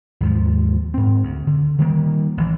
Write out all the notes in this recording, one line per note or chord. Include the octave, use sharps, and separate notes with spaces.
D#2 G#2 F3
G#2 C4
D2
D3
D#3 G3 A#3
A1 E3